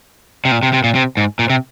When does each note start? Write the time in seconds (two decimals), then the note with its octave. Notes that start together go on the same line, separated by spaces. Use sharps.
0.45 C3
0.52 A#2
0.63 C3
0.73 C3
0.84 A#2
0.95 C3
1.17 G#2
1.39 A#2
1.50 C3